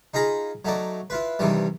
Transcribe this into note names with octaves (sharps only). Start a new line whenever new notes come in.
D#4 F4 G#4 A#5 B5
F#3 A3 D#4 D5
E4 F4 B4
G2 C3 D#3 E3 G3